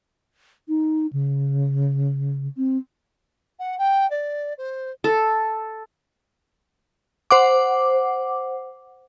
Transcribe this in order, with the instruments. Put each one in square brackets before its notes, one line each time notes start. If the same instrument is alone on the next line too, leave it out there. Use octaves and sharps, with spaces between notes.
[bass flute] D#4
C#3
C4
[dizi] F#5
G5
D5
C5
[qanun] A4
[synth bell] C5 F#5 D6